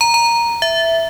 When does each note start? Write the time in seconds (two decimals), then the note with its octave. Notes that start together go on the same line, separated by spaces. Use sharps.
0.01 A#5
0.14 A#5
0.62 E5